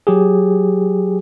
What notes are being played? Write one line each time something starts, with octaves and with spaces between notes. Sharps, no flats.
F#3 G4 G#4